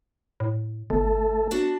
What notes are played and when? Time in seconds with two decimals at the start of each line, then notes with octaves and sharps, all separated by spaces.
0.40 A2
0.90 G1 A3 A4
1.51 D4 F#4 A5